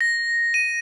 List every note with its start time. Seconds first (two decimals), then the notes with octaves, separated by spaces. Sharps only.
0.01 A#6
0.54 D#7